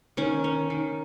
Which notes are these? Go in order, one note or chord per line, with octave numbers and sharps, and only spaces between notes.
D#3 C#4
C#4
D#3